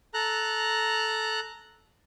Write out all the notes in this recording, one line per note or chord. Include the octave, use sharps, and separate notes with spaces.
A4 A#5 F#6